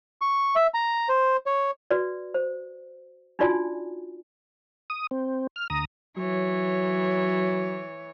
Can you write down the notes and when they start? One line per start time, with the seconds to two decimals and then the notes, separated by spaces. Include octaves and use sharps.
0.21 C#6
0.55 E5
0.74 A#5
1.09 C5
1.46 C#5
1.91 F#4 B4 D5
2.34 C5
3.39 D4 D#4 F4 F#4 D5 G#5
4.90 D#6
5.11 C4
5.56 F6
5.70 D2 A#5 D#6
6.17 E3 F#3 C#5